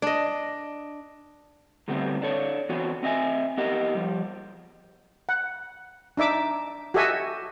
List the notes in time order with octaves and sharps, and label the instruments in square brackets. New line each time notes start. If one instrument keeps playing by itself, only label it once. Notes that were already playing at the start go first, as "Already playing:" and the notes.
[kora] D4 D#5
[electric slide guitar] A2 D3 G3 A3 B3 C4
D4 A4 C#5
E3 B3 C4 F#4
C4 D#5 E5 G#5
B3 G4 A#4 D#5
F3 G3
[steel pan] F#5
D4 D#4 E5 D6
F#4 G4 A4 D#5 E5 G#5